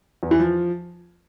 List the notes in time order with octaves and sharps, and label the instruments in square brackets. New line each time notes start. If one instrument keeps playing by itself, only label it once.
[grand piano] E2
E3
F3